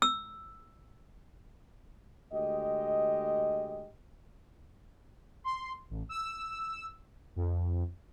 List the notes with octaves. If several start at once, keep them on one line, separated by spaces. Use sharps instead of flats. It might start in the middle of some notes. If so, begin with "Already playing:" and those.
E6
D2 G#3 G4 D#5
C6
A1
E6
F2